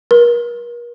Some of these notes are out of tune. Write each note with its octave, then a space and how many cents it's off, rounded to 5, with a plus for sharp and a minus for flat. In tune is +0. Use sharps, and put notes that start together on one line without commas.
A#4 +40